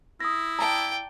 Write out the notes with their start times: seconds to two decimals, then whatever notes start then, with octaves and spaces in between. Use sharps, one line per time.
0.20 E4 D#6 A#6
0.59 D5 G5 A5 A#5